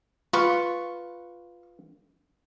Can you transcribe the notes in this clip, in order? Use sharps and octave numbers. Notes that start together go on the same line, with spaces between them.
F4 B4 C#6